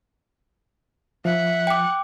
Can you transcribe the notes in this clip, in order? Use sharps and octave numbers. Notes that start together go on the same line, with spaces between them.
F3 E5 F#5
G5 D6